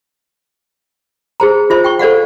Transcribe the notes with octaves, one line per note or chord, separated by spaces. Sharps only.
G#4 C5 A#5
F4 C5 E5
G5 C#6
A4 C5 D5 F5 F#5